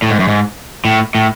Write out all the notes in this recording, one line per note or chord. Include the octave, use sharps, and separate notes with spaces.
A2
G#2
F#2
G#2
A2
A2